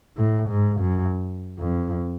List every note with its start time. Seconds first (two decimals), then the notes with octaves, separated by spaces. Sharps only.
0.17 A2
0.49 G#2
0.80 F#2
1.59 F2